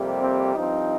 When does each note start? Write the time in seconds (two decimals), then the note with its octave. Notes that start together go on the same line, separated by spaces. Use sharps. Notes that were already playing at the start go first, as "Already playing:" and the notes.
Already playing: F2 C3 G3 A#3
0.21 C4
0.55 G2 F3 C4 D#4